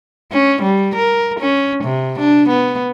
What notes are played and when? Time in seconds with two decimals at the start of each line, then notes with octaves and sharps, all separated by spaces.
0.32 C#4
0.62 G3
0.95 A#4
1.40 C#4
1.84 C3
2.19 D4
2.49 B3